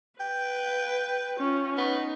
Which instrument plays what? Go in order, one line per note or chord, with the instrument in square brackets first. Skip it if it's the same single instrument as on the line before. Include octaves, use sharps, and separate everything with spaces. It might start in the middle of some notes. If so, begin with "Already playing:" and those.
[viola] B4 [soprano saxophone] G5
[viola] C#4 F4
[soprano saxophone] B3 [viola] D#4